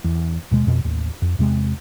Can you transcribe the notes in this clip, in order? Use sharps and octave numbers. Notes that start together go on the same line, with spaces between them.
E2
D#2 B2 G#3
F2 B2
A1 D#2
F2
E2 C3 G#3